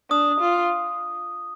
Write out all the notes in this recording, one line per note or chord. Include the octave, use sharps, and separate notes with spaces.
D4 D#6
F4